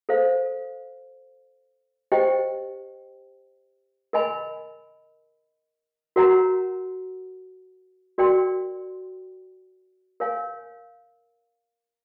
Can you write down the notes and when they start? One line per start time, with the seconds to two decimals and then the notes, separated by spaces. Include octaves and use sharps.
0.09 A4 C5 F5
2.12 G4 C5 D#5 G5
4.13 A#4 D#5 G#5 B5
6.16 F#4 A#4 C#5 F#5 A#5
8.18 F#4 A#4 D5 G5 C6
10.20 A#4 C#5 F5 G#5